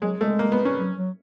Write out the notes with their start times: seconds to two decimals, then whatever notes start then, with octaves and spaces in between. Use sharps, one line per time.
0.02 F#3 G#3
0.21 G#3 A3
0.39 A#3
0.52 B3
0.65 C#4
0.78 F#3
0.97 F#3